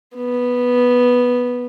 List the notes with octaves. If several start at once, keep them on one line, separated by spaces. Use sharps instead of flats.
B3